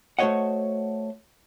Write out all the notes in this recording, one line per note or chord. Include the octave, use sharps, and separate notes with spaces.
A3 F#4 C5 C#5 D#5 F#5